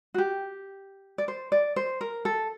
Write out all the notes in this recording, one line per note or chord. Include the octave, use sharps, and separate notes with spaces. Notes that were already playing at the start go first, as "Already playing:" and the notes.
F#4
G4
D5
C5
D5
C5
A#4
A4